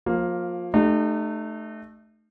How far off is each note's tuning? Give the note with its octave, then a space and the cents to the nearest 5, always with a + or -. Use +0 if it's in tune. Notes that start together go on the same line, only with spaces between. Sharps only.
F3 +25 A#3 +0
A3 -10 D#4 -40 G4 -5